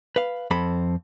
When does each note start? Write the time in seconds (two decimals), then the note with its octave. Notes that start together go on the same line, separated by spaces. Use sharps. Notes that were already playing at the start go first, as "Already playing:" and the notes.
0.16 B4 F5
0.51 F2 C4 A4 B5